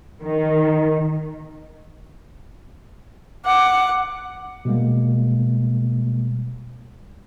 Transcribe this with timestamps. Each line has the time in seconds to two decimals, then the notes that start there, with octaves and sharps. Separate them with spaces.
0.22 D#3
3.45 F#5 D6
4.65 B2 G3 G#3 A#3